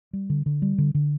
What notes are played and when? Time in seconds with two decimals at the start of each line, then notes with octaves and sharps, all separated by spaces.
0.13 G3
0.30 D3
0.46 D3
0.62 G3
0.78 D3
0.94 D3